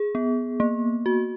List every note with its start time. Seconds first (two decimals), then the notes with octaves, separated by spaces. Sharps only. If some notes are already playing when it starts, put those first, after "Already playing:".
Already playing: G#4
0.15 B3
0.60 A#3
1.06 F#4